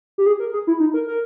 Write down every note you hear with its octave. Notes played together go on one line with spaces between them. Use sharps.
G4
G#4
A#4
G#4
E4
D#4
A#4
A#4